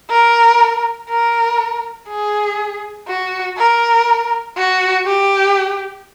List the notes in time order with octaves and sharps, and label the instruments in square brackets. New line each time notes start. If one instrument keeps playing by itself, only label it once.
[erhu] A#4
A#4
G#4
F#4
A#4
F#4
G4